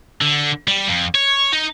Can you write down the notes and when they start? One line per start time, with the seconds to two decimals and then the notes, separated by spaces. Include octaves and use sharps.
0.21 D3
0.68 G3
0.88 F2
1.15 C#5
1.53 D#4